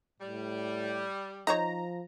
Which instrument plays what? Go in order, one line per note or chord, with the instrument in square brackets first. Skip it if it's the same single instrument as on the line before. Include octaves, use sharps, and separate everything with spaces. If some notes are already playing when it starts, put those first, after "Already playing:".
[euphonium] A2 [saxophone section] G3
[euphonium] F3 [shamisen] D#4 C5 C#5 [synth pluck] A#5